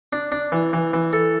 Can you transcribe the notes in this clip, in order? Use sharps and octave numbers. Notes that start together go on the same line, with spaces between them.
D4
D4
E3
E3
E3
A4